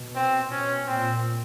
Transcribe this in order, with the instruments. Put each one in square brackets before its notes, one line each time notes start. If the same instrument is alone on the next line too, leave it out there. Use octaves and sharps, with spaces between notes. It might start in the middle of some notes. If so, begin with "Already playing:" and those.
Already playing: [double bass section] B2
[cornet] C4
[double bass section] B2 [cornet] C#4
[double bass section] A#2 [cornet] C4